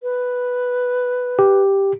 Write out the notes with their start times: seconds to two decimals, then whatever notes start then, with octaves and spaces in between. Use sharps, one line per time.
0.03 B4
1.39 G4